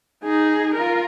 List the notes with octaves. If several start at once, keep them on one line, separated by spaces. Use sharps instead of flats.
D#4 G#4
F4 A#4